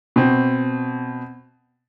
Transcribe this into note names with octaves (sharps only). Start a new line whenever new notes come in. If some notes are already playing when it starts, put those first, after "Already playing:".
B2 C4